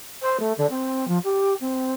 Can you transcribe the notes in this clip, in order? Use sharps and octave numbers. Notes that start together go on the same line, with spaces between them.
C5
A3
D3
C4
F3
G4
C4